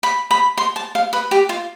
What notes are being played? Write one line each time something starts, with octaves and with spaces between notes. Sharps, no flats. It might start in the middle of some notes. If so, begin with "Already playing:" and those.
B5
B5
C6
A5
F5
B4
G4
F4